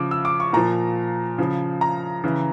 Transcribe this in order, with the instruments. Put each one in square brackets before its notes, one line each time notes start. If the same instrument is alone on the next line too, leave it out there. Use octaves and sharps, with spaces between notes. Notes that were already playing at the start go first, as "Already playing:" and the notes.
Already playing: [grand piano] C#3 F3 D6
E6
D6
C#6
A#2 F3 A#5
C#3 F3
A#5
C#3 E3